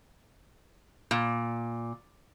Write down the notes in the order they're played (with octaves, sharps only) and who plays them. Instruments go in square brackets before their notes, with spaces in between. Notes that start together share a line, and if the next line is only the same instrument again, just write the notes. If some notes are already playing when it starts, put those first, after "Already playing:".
[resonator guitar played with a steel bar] A#2